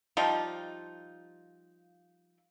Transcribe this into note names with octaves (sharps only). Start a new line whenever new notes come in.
F3 G3 D#4 F4